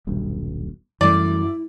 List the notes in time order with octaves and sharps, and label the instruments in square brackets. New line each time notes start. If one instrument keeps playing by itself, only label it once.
[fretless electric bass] D#1 B1 G2
[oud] F#2 [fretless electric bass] E3 G3 A3 [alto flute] E4 [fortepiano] D5